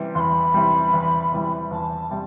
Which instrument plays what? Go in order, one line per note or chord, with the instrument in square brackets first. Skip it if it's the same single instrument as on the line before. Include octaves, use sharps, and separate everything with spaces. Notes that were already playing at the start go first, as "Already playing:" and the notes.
Already playing: [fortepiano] C3 E3 G3
[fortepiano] E2 [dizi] B5 C6
[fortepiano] C3 E3 G3
E2
C3 E3 G3
[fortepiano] E2 [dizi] A5
[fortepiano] C3 G3 [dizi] A5